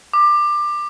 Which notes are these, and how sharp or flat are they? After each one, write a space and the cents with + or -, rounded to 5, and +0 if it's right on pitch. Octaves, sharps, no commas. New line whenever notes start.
D6 +20